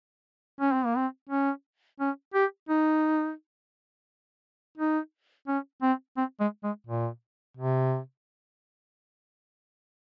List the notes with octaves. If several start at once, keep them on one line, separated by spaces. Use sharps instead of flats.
C#4
C4
A#3
C4
C#4
C#4
G4
D#4
D#4
C#4
C4
C4
G#3
G#3
A#2
C3